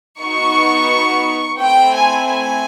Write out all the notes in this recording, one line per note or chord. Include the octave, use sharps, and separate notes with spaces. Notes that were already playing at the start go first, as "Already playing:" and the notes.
B3 D#4 F#4 C#6
A3 C4 E4 G5
G#5
G#5